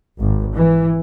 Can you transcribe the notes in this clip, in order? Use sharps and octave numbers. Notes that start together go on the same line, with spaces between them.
G#1
E3